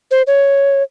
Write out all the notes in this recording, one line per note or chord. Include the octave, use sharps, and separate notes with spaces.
C5
C#5